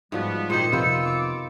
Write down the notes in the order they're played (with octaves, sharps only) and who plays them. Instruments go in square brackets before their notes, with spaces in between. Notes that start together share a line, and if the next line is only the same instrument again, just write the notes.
[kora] G#2 F3 F#4 [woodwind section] G3 B3
[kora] A#2 D#3 [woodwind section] C4 G#4 C5 [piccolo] C#7
[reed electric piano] F2 C3 [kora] B3 C5 [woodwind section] F4 E6
[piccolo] D6